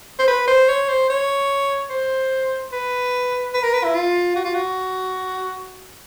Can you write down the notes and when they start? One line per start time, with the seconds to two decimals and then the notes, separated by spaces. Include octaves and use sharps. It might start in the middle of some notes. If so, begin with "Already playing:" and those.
0.19 C5
0.27 B4
0.47 C5
0.69 C#5
0.89 C5
1.10 C#5
1.90 C5
2.72 B4
3.54 B4
3.63 A#4
3.73 B4
3.84 E4
3.94 F4
4.36 F#4
4.45 F4
4.54 F#4